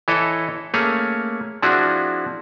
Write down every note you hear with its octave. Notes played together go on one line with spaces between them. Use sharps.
E3 E4 A4 C#5 D#5
A3 A#3 C#4 G#4 C#5
F3 C4 D4 E4 F#4 G#4